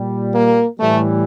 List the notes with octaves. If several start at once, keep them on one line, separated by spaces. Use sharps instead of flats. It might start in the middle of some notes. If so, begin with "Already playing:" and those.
Already playing: A#2 G3
A#3
A2 E3 G3 A3